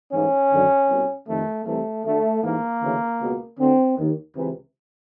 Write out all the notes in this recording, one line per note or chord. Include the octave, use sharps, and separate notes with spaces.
A1 G#2 E3 C#4
G#1 F#2 D3
C2 B2
F2 C3 D#3 A3
C2 C3 E3 A3
D2 D3 A3
A1 G#2 E3 A#3
D2 C#3 E3
C#2 B2
D2 D3 C4
D#2 D#3
C#2 C3 E3